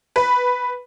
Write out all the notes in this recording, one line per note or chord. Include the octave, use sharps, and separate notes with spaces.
B4